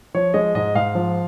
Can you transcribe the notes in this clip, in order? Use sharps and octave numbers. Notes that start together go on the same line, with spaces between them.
F3 C#5
G#3 D#5
G#2 D#5
G#2 F5
F3